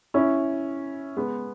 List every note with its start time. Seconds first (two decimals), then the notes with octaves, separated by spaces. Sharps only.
0.14 C#4 E4
1.17 G#3 B3